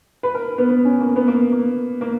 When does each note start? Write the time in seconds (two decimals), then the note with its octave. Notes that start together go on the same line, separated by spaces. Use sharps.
0.23 B4
0.35 A#4
0.58 B3
0.69 B3
0.85 C#4
1.00 A#3
1.16 B3
1.28 A#3
1.52 A#3
2.01 A#3